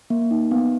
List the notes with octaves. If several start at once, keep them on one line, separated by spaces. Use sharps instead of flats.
A#3
D#4
B3